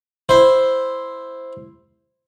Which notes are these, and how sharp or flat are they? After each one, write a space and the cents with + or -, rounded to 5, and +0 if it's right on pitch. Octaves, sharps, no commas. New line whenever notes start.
E4 +0 C5 +0